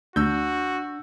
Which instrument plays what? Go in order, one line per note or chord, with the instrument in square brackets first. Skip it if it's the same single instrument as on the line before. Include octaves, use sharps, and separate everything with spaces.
[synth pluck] D2 [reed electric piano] D4 [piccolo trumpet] F#4 [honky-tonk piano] E6 G6